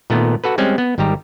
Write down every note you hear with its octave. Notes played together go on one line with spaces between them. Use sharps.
A#2 D#3 A3 B3
F#4 A4 B4
G3 G#3 C4 C#4
B3
G#1 D#3 G3 G4 A#5